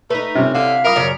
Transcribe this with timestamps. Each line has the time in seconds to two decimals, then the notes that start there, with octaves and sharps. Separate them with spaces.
0.10 A3 D#4 B4
0.35 C3 C#4
0.55 D3 E4 F5
0.84 A#4 E5 B5 D#6
0.96 F#2 C#3 C#5 D5